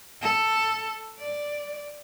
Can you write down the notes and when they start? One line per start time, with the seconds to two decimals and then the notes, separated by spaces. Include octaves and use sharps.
0.21 A4
1.19 D5